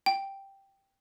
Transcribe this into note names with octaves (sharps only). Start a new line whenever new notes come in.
G5